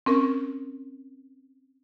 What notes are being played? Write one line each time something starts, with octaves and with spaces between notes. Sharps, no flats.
C4 C#4 A#4 C#6